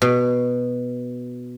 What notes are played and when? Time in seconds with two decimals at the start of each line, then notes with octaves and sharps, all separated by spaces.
0.02 B2